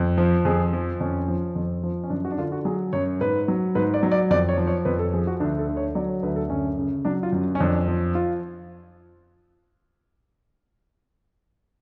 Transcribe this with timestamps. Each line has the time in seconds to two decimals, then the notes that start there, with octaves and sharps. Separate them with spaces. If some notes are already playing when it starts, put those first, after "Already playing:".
Already playing: F2
0.18 F3
0.45 F2 G#4
0.73 F3
1.00 F2 C#4
1.28 F3
1.55 F2
1.83 F3
2.04 C#4
2.10 F#2 D4
2.25 F#4
2.31 D4
2.38 D3 F4
2.52 F#4
2.65 F#3 G#4
2.93 F#2 C#5
3.21 G#2 B4
3.48 F#3
3.75 G#2 B4
3.94 D5
4.03 F#3
4.12 D5
4.30 F2 D5
4.49 C#5
4.57 F3
4.67 C#5
4.85 F2 B4
4.99 A4
5.13 F3 G#4
5.27 F#4
5.40 D2 D4
5.59 A4
5.68 D3
5.77 C#5
5.95 F#3 D5
6.09 C#5
6.23 D2 B4
6.36 A4
6.50 F#2 C#4
6.78 C#3
7.05 F#3 D4
7.23 F4
7.32 F#2
7.55 C#4
7.60 F2 D4
7.88 F3
8.15 F4